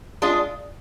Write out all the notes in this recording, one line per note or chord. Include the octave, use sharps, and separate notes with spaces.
G#3 D4 F4 G#4